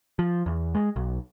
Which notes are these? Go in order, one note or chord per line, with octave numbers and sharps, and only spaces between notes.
F3
E2
G#3
B1